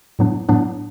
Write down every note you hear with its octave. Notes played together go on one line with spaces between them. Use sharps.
A2 F#3 B3 D4
A2 F#3 B3 D4